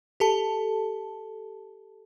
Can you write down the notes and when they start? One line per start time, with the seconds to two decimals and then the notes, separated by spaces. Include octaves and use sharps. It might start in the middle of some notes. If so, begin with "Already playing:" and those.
0.20 G4 A4 A5